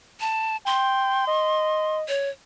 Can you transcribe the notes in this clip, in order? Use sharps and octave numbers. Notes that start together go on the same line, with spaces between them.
A5
G5 C6
D#5
C#5